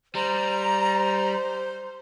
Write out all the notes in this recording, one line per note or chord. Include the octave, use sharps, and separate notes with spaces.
G3 C5 A#5